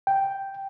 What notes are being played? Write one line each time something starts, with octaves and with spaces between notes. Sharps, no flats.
G5